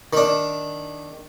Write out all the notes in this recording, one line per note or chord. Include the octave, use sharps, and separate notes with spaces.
D#3 D4